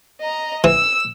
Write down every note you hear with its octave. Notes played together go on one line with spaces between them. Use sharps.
D#5 A#5
E3 E6